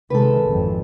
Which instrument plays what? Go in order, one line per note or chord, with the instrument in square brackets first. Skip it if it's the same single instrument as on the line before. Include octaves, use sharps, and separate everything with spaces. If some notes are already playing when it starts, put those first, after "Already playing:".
[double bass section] C3 D#3 G#3 [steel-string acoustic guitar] A4 B4
[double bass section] G#1 F2